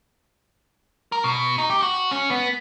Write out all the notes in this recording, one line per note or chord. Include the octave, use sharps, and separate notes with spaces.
A#4
B2
D#4
G4
F#4
C#4
B3